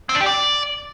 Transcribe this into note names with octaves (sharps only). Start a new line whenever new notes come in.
C4
D4
G4
D5